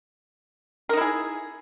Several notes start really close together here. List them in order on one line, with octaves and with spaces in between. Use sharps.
A#4 D#4 E4 G#4